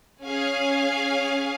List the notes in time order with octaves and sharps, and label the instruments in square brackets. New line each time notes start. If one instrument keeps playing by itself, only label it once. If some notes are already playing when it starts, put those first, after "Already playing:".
[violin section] C#4 G#4 F5 G#5